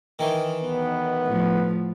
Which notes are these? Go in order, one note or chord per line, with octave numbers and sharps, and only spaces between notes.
D#3 E3
B1 B3
A2 F3